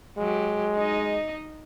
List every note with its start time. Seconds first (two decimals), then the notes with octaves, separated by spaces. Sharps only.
0.18 F#3 G#3 G4
0.77 D#4 D#5